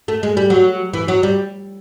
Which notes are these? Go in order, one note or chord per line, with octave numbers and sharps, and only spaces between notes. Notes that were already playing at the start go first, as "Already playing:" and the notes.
A3
G#3
G3
F#3
E3
F#3
G3